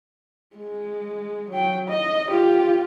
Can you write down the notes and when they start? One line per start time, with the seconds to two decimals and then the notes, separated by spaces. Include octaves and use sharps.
0.56 G#3
1.51 F#3 G5
1.89 D#5
2.30 F4 G4